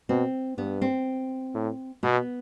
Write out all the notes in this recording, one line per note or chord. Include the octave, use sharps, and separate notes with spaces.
B2 C4
G2 B3
C4
A2
B2 B3